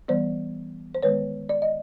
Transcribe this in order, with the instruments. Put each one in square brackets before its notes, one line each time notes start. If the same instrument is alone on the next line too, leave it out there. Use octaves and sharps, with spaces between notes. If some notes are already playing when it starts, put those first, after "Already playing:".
[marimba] E3 G3 B3 C5 D5
C5
D#3 G#3 B3 B4 C#5
D5
D#5